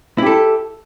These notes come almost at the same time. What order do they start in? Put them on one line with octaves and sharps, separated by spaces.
E4 G4 A4